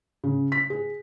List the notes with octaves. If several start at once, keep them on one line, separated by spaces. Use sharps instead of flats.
C#3
B6
G#4